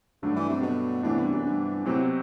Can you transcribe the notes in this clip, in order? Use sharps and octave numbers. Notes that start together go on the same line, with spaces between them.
G2 D3 F#3 A3 D4
E3
C3
B2
A2 C3 E3 B3 D4
G2
F#2
G2
A2 C3 F#3 C4 G4
B2